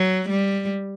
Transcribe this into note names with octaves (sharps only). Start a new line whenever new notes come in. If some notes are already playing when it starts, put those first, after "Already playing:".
Already playing: F#3
G3